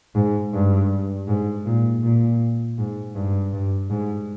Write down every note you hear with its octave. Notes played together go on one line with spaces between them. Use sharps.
G#2
G2
G#2
A#2
A#2
G#2
G2
G2
G#2